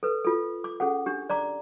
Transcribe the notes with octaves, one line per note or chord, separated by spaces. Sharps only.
A4 B4
F4 A4
D6
C#4 G#4 A4 F#5
D4 G4
D5 A#5 D6